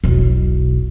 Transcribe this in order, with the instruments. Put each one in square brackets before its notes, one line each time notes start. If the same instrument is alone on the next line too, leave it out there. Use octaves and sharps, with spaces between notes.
[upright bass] E1 B1